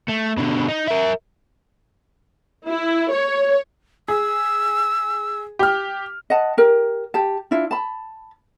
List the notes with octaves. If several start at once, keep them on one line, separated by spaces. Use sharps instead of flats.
A3
B2 D3
D#4
A#4 E5
E4
C#5
G#4 E6
G4 F6
D#5 F#5 A5
G4 A#4
G4 A5
D4 E4 F4
A5 B5